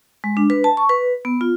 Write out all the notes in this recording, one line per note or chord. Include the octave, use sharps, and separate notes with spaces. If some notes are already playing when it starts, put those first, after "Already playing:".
G#3
D4
B4
A5
C#6
B4
B3
F4